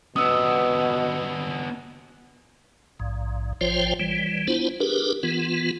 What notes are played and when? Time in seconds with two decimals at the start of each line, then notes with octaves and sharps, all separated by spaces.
0.16 B2 B3 D4 D#6 E6
3.00 A#1 G#2
3.61 A1 F3 F4 C5 C#5 G5
3.99 E3 G3
4.47 B3 D4 E4 F4 C5
4.80 D4 G4 G#4 A#4 B4
5.23 E3 B3 F4